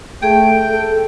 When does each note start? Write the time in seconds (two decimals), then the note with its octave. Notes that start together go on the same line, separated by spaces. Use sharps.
0.23 A3 G#4 G5
0.70 A4